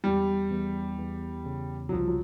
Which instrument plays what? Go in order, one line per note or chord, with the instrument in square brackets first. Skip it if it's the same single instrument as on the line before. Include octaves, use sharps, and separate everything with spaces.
[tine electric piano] E2 [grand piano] G3
[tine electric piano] E2
E2
C#3
[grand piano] F#3
[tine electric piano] C2 [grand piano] F3
[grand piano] F#3